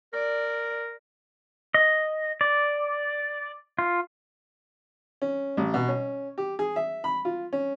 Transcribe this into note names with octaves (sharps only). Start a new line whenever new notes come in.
A#4 D5
D#5
D5
F4
C#4
A1
B2
C#4
G4
G#4
E5
B5
F4
C#4